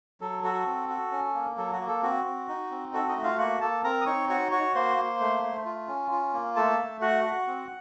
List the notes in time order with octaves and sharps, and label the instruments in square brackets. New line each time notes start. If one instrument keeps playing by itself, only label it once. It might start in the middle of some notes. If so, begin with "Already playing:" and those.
[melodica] F#3 A4
F#4 A4
C4
F#4
C#4
A#3
F#3 A4
F#4
A#3
A4
C4 F#4
C4
D#4
C4
F#4 A4
D#4 D#5
A3
F4 F5
A#3 F#4 F#5
A#3 A4 A5
C4 A#4 A#5
D#6
D#4 C#5 C#6
F#4 C#5 C#6
F#4 C#5 C#6
A#3 C5 C6
A#3
A3
A3
F4
C#4
F4
A#3
A3 A4 A5
A3
F#4 F#5
F#4
C4